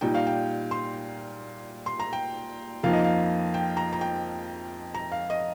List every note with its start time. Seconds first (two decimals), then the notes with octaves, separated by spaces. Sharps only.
0.01 A#2 G3 D#4 G5
0.14 F5
0.27 G5
0.71 C6
1.86 C6
2.00 A#5
2.13 G5
2.83 F2 F3 A#3 D#4 F5
2.93 D#5
3.04 F5
3.54 G5
3.77 A#5
3.93 A#5
4.01 G5
4.94 A#5
5.12 F5
5.30 D#5